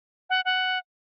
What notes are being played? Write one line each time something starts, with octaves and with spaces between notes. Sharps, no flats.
F#5
F#5